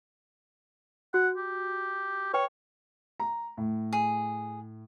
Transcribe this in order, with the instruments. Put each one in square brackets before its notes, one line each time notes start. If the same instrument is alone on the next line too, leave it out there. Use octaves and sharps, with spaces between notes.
[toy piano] F#4 [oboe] F#5
[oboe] G4
[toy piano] B4 G5 [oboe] C#5
[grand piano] A#5
A2
[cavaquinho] G#4